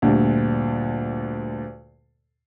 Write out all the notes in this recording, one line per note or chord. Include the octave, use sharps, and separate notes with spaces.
D2 G2 A#2